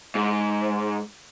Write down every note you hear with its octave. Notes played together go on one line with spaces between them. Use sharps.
G#2